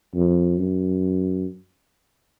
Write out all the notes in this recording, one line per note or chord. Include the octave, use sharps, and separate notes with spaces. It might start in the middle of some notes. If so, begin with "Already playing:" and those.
F2
F#2